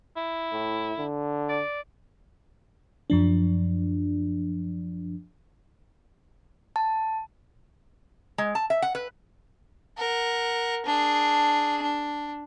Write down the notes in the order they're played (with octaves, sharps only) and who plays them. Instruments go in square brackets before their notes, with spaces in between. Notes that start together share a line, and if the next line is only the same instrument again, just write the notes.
[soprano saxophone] E4
[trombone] A2
D3
[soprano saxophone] D5
[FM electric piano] F#2 F3 D4
[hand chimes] A5
[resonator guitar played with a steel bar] G#3
A5
E5
F#5
B4
[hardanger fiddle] A#4 F#5
D4 G#4
D4